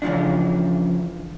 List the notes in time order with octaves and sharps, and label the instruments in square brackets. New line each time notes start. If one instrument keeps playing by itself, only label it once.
[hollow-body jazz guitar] C#3 E3 F3 D4